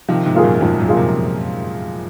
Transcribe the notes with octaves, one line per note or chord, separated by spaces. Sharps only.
C3 D#3 F3
G#2 C3
A#3 F4 G#4
F#2 A#2
F#2
F2 G#2 F3
F#2 A#2
A#3 F4 G#4
G#2 C3